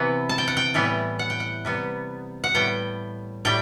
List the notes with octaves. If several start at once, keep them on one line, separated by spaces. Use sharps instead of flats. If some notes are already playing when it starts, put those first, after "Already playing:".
Already playing: C3 E3 B3
A5
G5
F#5
G5
A2 E3 G3 B3
F#5
G5
F#5
C3 G3 B3
F#5
A2 G3 B3 G5
A2 G3 G5